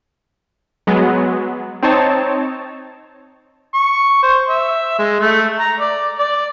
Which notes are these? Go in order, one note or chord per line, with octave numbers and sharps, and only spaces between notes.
F#3 G#3 B3
C4 D#4 C#5 A5
C#6
C5
E5
G#3
A3
A#5
D5
D5